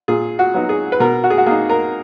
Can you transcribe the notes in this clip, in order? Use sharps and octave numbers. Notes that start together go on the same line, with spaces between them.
A#2 G#4
F#4
F#3 B3 D#4
G#4
B4
B2 A#4
F#4
G#4
F#4
A#3 D#4 G#4
A#4